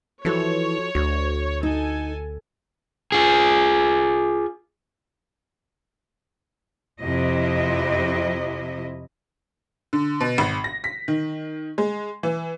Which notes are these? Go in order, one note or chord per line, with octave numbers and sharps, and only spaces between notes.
E3 F3 F#4 A4 C#5
D2 F#4
D#4 A4 G#5
F4 G#4
F2 C3 E4 D#5
D3
B2
G#1
A#6
B6
D#3
G#3
E3